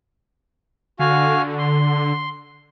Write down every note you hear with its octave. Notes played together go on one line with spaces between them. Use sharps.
D3 F#4 F5 G#5
C6